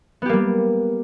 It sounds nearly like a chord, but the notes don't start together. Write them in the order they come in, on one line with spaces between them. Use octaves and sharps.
B3 G4 A#3 G3